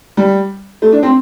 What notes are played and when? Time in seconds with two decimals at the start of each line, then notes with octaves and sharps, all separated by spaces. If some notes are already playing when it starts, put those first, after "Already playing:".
0.17 G3
0.82 A3
0.92 D4
1.03 C4